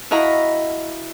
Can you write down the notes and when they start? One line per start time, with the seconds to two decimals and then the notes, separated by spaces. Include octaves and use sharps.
0.11 E4 F#4 D#5 F5 A#5 B5